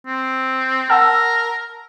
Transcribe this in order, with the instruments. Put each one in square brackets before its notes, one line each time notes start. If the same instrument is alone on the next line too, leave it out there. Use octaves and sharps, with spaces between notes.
[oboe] C4
[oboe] A#4 [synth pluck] F#5 A5 E6